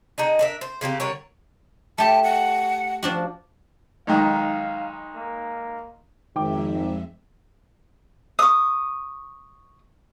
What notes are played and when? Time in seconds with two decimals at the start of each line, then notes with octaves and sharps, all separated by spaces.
0.18 D3 D#4 G#4 D#5
0.39 D4 A#4 E5
0.61 C5
0.81 C#3 A#3 C4 G4
1.00 D3 G3 A#4 C#5
1.98 A3 G4 A5
2.24 F#5
3.03 F3 D4 F#4
4.07 B1 G#2 D#3 F5
5.16 A#3
6.36 G#1 F2 D#3 G#3 E5 G5 D6
8.39 C#6 D#6